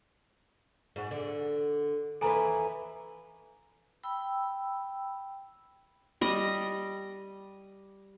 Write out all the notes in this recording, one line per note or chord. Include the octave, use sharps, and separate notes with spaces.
G#2 F#4
D3
D#2 E3 A4 B4 G#5 A#5
G5 B5 E6
G3 D#5